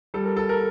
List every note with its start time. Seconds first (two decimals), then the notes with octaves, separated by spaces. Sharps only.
0.14 G3 A4
0.25 A#4
0.37 A4
0.49 A#4